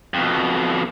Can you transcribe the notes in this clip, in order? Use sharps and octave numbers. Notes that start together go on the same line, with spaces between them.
F2 B2